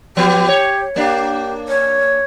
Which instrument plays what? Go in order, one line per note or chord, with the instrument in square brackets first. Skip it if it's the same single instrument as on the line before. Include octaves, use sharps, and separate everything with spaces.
[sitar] F3 B3 [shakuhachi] G4
[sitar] C#5
[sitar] A#3 D4 [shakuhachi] G4
[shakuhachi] C#5